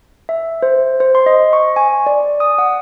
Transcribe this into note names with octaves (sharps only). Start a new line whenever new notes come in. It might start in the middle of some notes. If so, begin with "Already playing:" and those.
E5
C5
C5
C6
D#5
C#6
G#5
D5
D#6
F#5